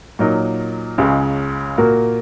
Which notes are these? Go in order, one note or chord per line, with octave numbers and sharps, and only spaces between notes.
A#2 F#3 D#4 A#4
C#2 C#3 G#3 C#4
A#2 A#3 F#4 A#4